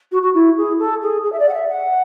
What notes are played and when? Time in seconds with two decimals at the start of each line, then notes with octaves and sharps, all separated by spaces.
0.12 F#4
0.22 F#4
0.34 E4
0.57 G#4
0.79 A4
1.02 G#4
1.23 G#4
1.32 E5
1.39 D5
1.49 F#5
1.53 E5
1.69 F#5